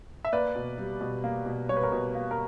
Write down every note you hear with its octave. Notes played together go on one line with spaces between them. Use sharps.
E5
A#3 B4 D5
B2
G3
B2
A#3
B2
G3 C#5
B4
A#4 C#5
B2
A#3
A#4